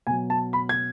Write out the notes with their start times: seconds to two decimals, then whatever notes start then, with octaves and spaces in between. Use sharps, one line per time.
0.07 B2 F#3 G#5
0.30 A5
0.53 B5
0.69 G#6